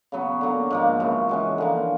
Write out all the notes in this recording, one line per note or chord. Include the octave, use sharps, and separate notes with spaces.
C#3 F#3 B3
D3 F#3 A#3
G#2 F3 A#3
F#2 C#3 E3
E3 G#3 C#4 F#4
D3 F3 A#3